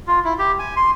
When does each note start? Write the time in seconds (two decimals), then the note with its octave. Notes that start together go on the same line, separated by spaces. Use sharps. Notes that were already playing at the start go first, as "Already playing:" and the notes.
0.07 F4
0.25 E4
0.39 G4
0.59 G#5
0.76 C6